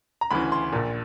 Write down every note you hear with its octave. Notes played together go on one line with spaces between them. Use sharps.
A#5
D2 C#3 E3 B5
C6
A#1 A#2